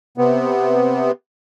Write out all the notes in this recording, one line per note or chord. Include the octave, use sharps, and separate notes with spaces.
C3 B3